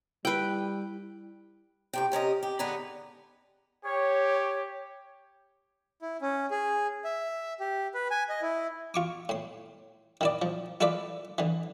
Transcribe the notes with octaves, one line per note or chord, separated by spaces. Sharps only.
G3 E4 B4 G5
A2 C3 G5
C3 C#4 A#4 D#5
G4
G#2 D3 B3 B4 G#5 A#5
G4 C#5
E4
C#4
G#4
E5
G4
B4
G#5
D#5
E4
F4 C#6 D6
A2 C6
D#3 E4 D5
F3
E4 F4 A4 B4 D5
D3 E3